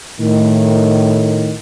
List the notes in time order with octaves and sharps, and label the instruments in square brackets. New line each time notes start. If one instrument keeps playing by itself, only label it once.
[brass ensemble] A2 D#3